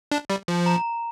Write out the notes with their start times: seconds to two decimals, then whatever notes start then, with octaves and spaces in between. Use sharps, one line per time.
0.12 D4
0.30 G3
0.48 F3
0.66 A#5